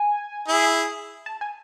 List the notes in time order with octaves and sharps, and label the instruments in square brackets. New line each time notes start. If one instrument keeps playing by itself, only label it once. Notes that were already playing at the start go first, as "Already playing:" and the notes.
Already playing: [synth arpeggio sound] G#5
[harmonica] E4 G#4
[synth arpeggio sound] A5
G#5